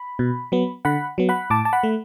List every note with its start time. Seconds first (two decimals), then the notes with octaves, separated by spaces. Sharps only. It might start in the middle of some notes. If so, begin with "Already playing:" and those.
Already playing: B5
0.19 B2
0.52 F#3 B3
0.85 D3 F#5 B5
1.18 F#3 B3
1.29 F#5 B5
1.50 A2 A5 D6
1.65 A5
1.73 F#5 B5
1.83 A3